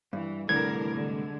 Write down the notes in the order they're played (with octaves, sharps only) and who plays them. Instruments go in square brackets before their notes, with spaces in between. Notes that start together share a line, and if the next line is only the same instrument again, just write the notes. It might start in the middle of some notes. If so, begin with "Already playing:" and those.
[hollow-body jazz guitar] G2 [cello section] E3
[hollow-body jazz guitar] C2 A2 E3 [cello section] D3 D4 A#4 [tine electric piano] G#6
[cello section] D3 G#3